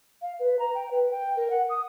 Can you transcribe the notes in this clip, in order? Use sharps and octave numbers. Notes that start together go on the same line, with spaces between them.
F5
B4
A#5
G5
B4
G5
A#4
F#5
D#6